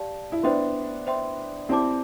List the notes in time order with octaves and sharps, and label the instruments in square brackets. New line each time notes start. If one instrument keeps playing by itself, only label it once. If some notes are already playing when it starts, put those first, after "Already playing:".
Already playing: [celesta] G4 D5 F5 A5
[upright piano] E4
[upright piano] B3 D4 [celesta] C5 E5 G5 C6
[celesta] C5 E5 G5 C6
[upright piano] C4 E4 [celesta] G4 D5 A5 D6